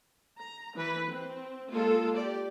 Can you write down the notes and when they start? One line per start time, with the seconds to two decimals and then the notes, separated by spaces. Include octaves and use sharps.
0.40 A#5
0.75 E3 B4
1.07 C4
1.72 G#3 A#3 F4 A4
2.15 G4 D5